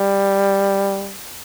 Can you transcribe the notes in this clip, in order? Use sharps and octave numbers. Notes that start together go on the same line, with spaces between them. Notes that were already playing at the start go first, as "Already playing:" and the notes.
Already playing: G3